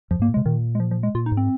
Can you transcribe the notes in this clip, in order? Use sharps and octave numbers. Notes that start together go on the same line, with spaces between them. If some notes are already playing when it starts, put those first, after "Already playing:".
F2 F3
G#2 A#3
A#2
G#3
C3
A#2 D#3
G#3
F3
F3
G#3
A#2 F4
D#4
G#2
C4